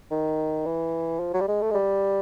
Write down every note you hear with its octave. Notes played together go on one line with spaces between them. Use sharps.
D#3
E3
F3
F#3
G3
G#3
A3
G#3
G3